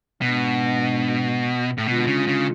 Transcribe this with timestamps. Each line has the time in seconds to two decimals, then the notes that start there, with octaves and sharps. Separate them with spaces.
0.21 G#2 B2 G#3 D4
1.78 A2
1.86 B2 D3 G#3 D4 F4
2.07 C#3
2.28 C#3